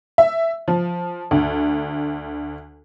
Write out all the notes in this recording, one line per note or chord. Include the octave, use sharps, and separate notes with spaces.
E5
F3
D2